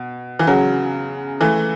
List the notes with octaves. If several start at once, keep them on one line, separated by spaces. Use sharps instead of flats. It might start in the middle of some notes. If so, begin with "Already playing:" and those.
Already playing: B2
E3
C#3 F#3
E3 A3